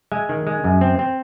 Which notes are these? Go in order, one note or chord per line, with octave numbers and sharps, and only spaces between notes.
G#3 E5 G#5
D#3
G#3
F#2
C4
C4